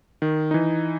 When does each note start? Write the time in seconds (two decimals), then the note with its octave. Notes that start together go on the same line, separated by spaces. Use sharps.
0.22 D#3
0.51 E3 D#4